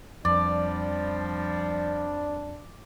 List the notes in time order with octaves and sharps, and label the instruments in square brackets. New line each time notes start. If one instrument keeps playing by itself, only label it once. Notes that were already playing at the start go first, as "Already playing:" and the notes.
[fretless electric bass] F2 [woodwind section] F3 G3 [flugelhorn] D4 [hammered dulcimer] D5